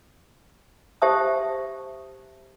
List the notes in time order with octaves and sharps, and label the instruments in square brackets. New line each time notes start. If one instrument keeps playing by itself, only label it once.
[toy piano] G4 C5 E5 A5 D#6